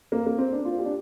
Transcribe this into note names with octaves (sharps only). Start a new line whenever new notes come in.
A#3
A#3
C4
D4
F4
G4
D4